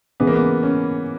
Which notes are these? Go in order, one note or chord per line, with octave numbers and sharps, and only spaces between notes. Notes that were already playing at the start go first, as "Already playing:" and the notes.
C#3 E3 G#3 B3
A#3
B3
C#4